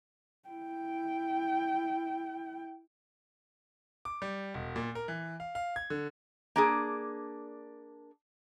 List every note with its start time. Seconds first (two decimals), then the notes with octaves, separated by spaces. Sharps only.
0.49 E4 G5
4.05 D6
4.22 G3
4.54 E1
4.76 A#2
4.95 A#4
5.08 E3
5.40 F5
5.55 F5
5.76 G#6
5.90 D3
6.56 A#3 D4 G#4